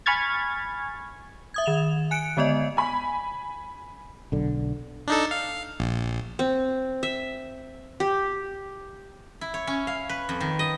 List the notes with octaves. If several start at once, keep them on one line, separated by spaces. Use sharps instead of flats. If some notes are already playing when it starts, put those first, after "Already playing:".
G#5 B5 C#6 F6 G#6 A6
E5 D#6 G#6
D#3 E7 F7
G#5 F#6 C#7 D7
D3 G#3 B3 D5 D#5
G#5 B5
B1 D3
D4 D#4 A4
F5
A#1
C4
E5
G4
E4
C#5
C#4
F5
B4
F2
D#3
D#5